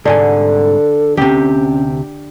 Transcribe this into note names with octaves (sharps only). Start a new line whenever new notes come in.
C2 G#2 D3 A4 G#5
D2 C3 C#4 G4